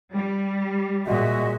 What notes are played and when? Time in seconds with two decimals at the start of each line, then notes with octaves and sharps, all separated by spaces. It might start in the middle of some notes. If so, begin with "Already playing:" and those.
0.16 G3
1.06 A#2 G#3 F#4 D#5 E5